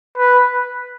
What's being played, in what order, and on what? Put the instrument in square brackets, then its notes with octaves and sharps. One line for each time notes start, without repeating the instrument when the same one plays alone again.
[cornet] B4